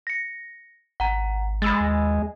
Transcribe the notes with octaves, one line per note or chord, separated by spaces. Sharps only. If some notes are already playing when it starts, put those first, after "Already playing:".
A#6 C#7
G#1 F#5 A#5
G#3 B5 E6 A6
D#2